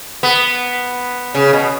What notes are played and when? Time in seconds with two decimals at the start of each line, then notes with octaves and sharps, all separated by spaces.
0.23 B3
1.35 C#3
1.53 B2